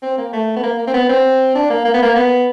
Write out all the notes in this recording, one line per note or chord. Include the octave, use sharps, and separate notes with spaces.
C4
A#3
A3
B3
A#3
A#3
C4
B3
C4
D4
A#3
A#3
B3
A#3
B3